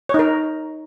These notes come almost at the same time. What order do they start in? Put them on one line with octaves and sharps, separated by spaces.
C#5 D#4 A#4